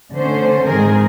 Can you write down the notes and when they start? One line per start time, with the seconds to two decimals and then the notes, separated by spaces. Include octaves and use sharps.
0.13 D3 A3 C#4 C5
0.65 G#2 D#3 G#3 C4 G#4 A#4